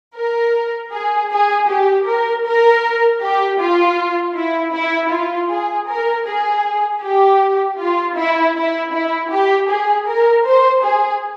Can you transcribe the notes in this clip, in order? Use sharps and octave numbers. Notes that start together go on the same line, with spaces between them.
A#4
G#4
G#4
G4
A#4
A#4
G4
F4
E4
E4
F4
G#4
A#4
G#4
G4
F4
E4
E4
E4
G4
G#4
A#4
C5
G#4